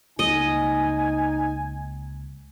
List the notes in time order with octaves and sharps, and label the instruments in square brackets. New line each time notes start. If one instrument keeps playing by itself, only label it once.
[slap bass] C#2 G3 A#3 [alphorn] D#4 [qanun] D#5 [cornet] G#5